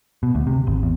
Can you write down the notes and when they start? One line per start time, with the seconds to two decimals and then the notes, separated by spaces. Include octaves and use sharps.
0.23 B2
0.35 D2
0.47 C3
0.67 G#1
0.83 E2